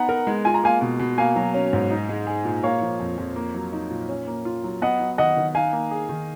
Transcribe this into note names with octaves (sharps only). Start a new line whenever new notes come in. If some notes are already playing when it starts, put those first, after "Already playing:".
Already playing: B3 D#4 F#5 A#5
A#4
G#3
F4 G#5
A#5
A#3 F5 G#5
B2
B2
A#3 F5 G#5
F#3
C#4
G#2
D#4
G#3
G#4
A#2
A#3 C#5 F5
F3
F2
F2
A#3
F#3
D#4
A#2
C#4
A#3
F4
F#3
B3 D#5 F#5
F#3
D#3 D#5 F#5
D#3
D#4 F5 G#5
A#3
G#4
D#3